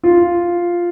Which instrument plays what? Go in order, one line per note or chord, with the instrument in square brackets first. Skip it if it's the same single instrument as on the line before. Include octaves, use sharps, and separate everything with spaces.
[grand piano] F4